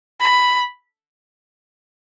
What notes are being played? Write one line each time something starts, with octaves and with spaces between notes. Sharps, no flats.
B5